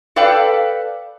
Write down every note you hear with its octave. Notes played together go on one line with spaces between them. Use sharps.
A4 B4 D5 F5 G5